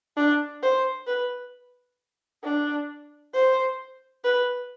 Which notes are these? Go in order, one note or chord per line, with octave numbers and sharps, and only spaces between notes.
D4
C5
B4
D4
C5
B4